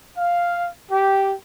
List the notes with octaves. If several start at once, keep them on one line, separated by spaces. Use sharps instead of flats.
F5
G4